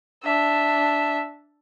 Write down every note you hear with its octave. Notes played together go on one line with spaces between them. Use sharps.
D4 E5